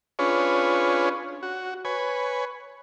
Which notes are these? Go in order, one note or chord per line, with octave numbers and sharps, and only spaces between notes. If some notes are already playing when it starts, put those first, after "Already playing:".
C#4 D4 F4 G#4 B4 C#5
F#4
B4 C#5 G#5